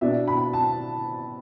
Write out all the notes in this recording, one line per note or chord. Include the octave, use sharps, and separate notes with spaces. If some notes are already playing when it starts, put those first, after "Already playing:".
B2 B3 D4 E5
B5
A5